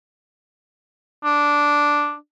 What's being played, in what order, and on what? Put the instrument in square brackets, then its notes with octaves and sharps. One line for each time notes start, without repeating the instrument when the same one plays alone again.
[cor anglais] D4